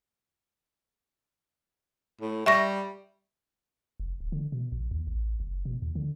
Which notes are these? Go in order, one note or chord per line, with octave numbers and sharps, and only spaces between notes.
A2
G3 E5 C#6 A#6
F1
D1
D3
B2
A#1
D#2
A1
F#1
B2
D#2
D3